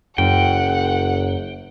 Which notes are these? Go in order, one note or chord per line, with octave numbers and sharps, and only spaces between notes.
F#1 F#2 F#5 G5